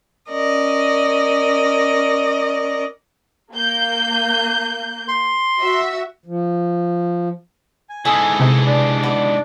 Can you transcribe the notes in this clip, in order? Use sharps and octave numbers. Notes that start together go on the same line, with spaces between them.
C#4 A#4 D5 D#5
A#3 G6
C6
F#4 E5
F3
G#5
G#2 E3 G#4 A4 G#5
C3
D4 D5
B3